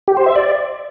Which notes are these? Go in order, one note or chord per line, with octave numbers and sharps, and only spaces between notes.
G4
C5
E5
D5